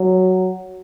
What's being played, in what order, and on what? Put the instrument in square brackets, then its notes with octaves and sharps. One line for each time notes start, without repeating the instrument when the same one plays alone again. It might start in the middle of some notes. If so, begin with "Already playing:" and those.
Already playing: [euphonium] F#3